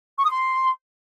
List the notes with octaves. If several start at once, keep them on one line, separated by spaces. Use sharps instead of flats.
C#6
D#6
C6